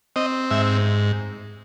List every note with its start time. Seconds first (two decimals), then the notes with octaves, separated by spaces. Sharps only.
0.16 C4 D#5
0.51 G#2 E5